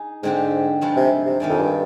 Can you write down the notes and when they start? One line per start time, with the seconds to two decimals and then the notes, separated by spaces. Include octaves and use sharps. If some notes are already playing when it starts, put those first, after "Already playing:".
Already playing: D#4 G#4
0.23 G#2 D3 G#3 C4 D#4 G4
0.81 G2 F3 G#3 D#4
0.96 C3
1.26 C3
1.40 D#3 G#3 D#4 G#4 D5
1.50 F2
1.59 G2